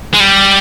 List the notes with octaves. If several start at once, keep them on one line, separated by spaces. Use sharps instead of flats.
G#3
G3